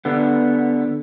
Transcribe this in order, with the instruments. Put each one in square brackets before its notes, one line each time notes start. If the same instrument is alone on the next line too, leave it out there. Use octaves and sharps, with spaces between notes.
[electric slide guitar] D3 B3